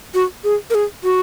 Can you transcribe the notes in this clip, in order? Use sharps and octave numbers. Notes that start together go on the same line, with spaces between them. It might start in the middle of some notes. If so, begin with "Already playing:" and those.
F#4
G#4
A#4
G#4
F#4